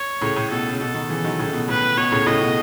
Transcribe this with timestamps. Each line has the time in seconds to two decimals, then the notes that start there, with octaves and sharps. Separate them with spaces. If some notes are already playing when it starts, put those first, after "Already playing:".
Already playing: C#5
0.21 A2 C#3
0.36 A2
0.50 B2 A4
0.72 C#3
0.80 B2 A4
0.94 B2 D#3
1.09 C#3 E3
1.24 D#3 F#3
1.39 A2 C#3
1.53 B2
1.68 A2 B4
1.97 B2 C#5
2.11 A2 C#3
2.26 A2 C#3 D#5
2.41 B2